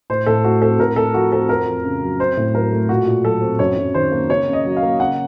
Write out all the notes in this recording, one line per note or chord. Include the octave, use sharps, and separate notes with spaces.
A2 C5
A2 A4
A3 F#4
C4 A4
A2 A#4
A2 A4
F3 F#4
C4 A4
F2 A#4
F2
C#3
F#3
C4 C5
A2
F#3 A#4
A3
A#2 F#4
A#2
F#3 A4
C4
F#2 C#5
F#2
D#3 C5
A#3
C#3 C#5
C#3
D#5
F#3
F5
A#3
C#3 F#5